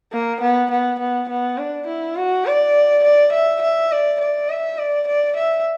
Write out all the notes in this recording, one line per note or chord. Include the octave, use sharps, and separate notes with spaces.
A#3
B3
B3
B3
B3
D4
E4
F#4
D5
D5
E5
E5
D5
D5
E5
D5
D5
E5